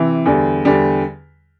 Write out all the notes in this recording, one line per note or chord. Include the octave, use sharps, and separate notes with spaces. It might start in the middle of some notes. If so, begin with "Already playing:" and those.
Already playing: C3 E3
E2 D3 G3
E2 D3 G3